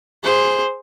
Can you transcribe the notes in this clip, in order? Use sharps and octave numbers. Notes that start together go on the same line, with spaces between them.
G#4 C5